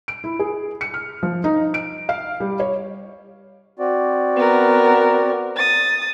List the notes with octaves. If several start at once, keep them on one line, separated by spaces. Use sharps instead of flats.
D7
E4
G#4
C#7
F6
F3
D#4
D7
F5
G3
C#5
C4 F#4 D5
B3 A#4
D#6 A6